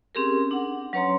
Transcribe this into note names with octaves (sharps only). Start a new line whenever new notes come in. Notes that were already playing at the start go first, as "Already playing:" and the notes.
C4 C#4 G4 G#4 A#4
D4 F#5
F#3 C#4 B4 C#5 A#5 C6